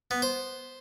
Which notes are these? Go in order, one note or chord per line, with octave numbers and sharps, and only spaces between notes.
B3
C5